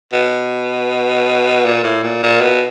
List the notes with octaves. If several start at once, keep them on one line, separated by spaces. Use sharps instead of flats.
B2
A#2
A2
A#2
A#2
B2